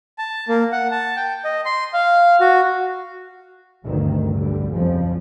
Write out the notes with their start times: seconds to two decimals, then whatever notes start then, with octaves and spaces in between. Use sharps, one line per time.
0.18 A5
0.48 A#3
0.72 F#5
0.91 A5
1.17 G5
1.45 D#5
1.65 C6
1.93 F5
2.40 F#4
3.85 A1 D2 G2 C3 D#3
4.36 B1 D3 G3
4.72 F2 C#3 F3